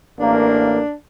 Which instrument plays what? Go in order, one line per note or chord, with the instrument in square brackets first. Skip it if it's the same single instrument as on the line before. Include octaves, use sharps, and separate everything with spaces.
[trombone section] A1 A#3 [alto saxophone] D4